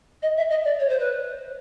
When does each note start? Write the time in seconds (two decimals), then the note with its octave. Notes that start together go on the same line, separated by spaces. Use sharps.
0.22 D#5
0.37 E5
0.50 D#5
0.64 D5
0.79 C#5
0.89 C5
0.99 B4